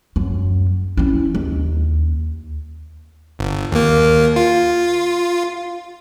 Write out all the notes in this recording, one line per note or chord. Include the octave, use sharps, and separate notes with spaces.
F#2
C#4 E4
D#2
G1
D#2 A#3
F4